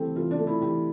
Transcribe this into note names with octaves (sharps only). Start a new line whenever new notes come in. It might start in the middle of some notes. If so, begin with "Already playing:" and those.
Already playing: E3 A3 C4 G4 A4
E3 F4
D4
A3
E4
E3 G4